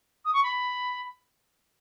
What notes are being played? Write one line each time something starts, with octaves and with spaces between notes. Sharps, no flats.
D#6
C#6
B5